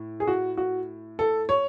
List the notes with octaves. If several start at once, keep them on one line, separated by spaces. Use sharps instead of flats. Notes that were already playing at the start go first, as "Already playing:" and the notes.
Already playing: A2
G#4
F#4
F#4
A4
C#5